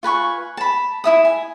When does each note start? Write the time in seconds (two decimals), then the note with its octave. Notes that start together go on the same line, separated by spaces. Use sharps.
0.03 F4 B4 G#5 C#6
0.57 A5 B5
1.04 E4 E5 D#6
1.25 G#5